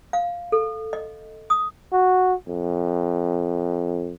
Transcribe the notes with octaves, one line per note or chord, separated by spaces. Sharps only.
F5
A4
D#5
D#6
F#4
F2